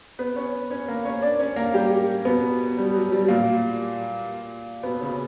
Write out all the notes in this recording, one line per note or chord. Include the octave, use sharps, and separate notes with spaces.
B3 B4
C#4 C#5
C#4 C#5
A#3 A#4
C#4 C#5
D4 D5
C#4 C#5
A#3 A#4
G3 G4
B2 B3
G3
F#3
G3
A#2 A#3
B2 B3
C#3 C#4